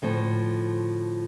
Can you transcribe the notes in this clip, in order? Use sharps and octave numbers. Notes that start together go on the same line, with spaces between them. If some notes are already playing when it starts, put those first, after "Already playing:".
D2 A2 F3 A4